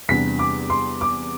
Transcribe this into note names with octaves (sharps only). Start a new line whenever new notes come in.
E2 C3 G3 B3 D4 B6
D6
C6
D6